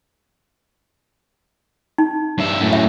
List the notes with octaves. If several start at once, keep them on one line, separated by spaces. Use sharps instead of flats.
D#4
G2 E5
F#2 A2
E5